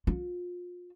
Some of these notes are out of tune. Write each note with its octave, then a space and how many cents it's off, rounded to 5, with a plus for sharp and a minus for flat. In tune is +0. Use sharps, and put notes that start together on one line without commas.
F4 +30